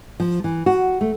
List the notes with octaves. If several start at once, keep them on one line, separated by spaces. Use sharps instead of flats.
F3
E3
F#4
A3